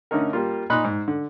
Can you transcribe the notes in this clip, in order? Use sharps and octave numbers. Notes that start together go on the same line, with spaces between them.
D3 A3 C#4 D#4 A#4
G3 A#3 F4
A#2 D#4 B5 C6 F#6
G#2
D3